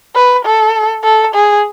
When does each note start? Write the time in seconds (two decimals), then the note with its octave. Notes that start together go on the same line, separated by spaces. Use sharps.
0.16 B4
0.45 A4
1.04 A4
1.35 G#4